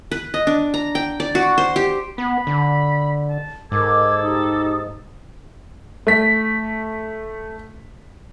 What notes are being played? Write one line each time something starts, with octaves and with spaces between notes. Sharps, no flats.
B4
D#5
D4
A#5
G5
D5
F#4
C5
G4
B3 B5
D3
A5
G#2 A4 A#4 D6 G#6
D#4 G4 D#6
A3 B6